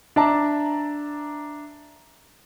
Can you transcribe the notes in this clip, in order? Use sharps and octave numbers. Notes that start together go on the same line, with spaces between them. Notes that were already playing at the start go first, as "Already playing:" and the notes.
D4 D5 E5 A5 A#5